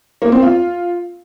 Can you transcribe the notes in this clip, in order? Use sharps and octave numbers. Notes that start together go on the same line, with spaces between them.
A#3
C4
F4